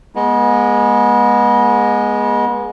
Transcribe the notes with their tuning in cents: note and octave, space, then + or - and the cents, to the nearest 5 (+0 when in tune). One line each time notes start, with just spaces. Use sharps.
G#3 +0 B3 -35